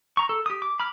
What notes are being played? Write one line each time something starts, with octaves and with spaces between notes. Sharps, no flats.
A#5 C#6
A4
G4 D#6
D6
B5 D6 F6